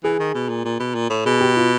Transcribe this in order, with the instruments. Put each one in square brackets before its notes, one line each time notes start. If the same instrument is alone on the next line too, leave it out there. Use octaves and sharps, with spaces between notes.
[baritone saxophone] E3 [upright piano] G#4
[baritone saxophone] D#3
B2
A#2
A#2
B2
A#2
A2
[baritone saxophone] B2 [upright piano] G#4
[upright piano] G4
F4